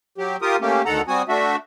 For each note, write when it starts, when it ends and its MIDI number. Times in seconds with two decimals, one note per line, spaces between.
0.18 0.37 54
0.18 0.37 67
0.42 0.56 65
0.42 0.56 67
0.42 0.56 70
0.42 0.56 87
0.61 0.82 57
0.61 0.82 58
0.61 0.82 61
0.61 0.82 67
0.86 1.01 38
0.86 1.01 51
0.86 1.01 69
0.86 1.01 78
0.86 1.01 82
1.08 1.22 55
1.08 1.22 60
1.08 1.22 66
1.08 1.22 80
1.08 1.22 87
1.29 1.56 57
1.29 1.56 62
1.29 1.56 66
1.29 1.56 76